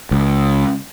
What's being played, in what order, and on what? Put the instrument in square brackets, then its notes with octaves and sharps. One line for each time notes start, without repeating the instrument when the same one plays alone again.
[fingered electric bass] C#2